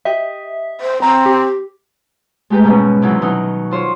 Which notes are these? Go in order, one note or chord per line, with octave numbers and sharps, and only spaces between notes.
G4 D#5 E5
C5
C4 A#5
G4
G#3 A3 G4 B4 A#5
G#2 B2 G3 B3 C#4
C3 D#3 E3 F#3 C#4
B2 F#3 D#4
F4 C5 C#5